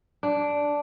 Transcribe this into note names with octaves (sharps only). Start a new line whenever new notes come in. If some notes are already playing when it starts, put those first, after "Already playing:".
D4